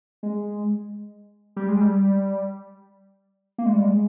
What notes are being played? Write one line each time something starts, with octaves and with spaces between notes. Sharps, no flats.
G#3
G3
G#3
G3
A#3
G#3
G3
G#3